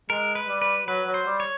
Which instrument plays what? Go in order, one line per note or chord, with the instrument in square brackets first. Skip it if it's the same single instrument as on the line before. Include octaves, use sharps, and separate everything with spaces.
[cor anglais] G#3 [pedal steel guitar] A#4
[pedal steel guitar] B4
[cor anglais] G3
[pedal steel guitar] B4
[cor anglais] F#3 [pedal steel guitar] B4
[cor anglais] F#3
[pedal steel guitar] C5
[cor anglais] G3
[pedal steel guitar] C#5